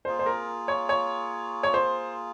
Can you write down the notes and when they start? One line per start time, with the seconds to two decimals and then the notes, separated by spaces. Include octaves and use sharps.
0.05 A#3 F4 G#4 C5
0.19 C5
0.26 A#4
0.68 C#5
0.89 C#5
1.63 C#5
1.74 C5